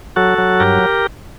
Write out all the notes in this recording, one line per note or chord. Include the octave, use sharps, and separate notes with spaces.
F#3 F#4 A4
F#3
G2 G4 A#4